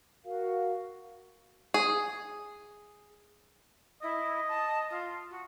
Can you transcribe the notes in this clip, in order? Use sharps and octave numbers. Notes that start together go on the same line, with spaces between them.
F#4 A#4 F5
G#4
E4 D#5
A5
F4
F#4